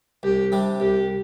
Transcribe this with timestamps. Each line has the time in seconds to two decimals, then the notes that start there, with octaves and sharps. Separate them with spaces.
0.23 C2 G4
0.52 C3 G3 D4
0.80 C2 G4